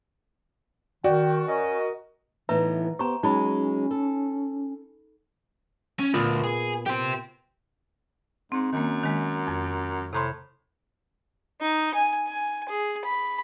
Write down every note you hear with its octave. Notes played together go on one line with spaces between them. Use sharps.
D#3 F#4 D5 G5
C#4 A#4 D#5
A2 E3 B3 D#4 B4 E5 A#5
B3 G4 C5 A#5 C#6
F#3 G#3 C#4 D#4 B5
A4
C#4
D2 A#2 B3
G#4
G4 C5 G5
G#2 C4
F#2 D#3 A#3
D#3 G#3
F2
A2 C3 A#5 C6
D#4
G#5
G#5
G#4
B5